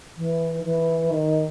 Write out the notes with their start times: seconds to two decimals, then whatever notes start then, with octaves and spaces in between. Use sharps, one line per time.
0.17 E3
0.64 E3
1.10 D#3